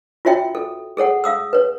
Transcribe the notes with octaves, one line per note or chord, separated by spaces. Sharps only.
F4 F#4 C#5 E5 G5
A4
G#4 A4 C#5 F#5
F5 D#6 E6
B4 C#5